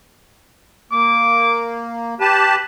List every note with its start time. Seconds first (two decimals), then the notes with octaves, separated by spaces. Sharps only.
0.92 A#3 D6
2.20 G4 B4 A5